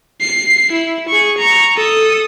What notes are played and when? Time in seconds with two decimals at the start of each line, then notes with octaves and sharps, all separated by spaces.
0.21 C7
0.72 E4
1.09 G#4 C#6
1.38 A#5 C#6
1.76 A4 D#6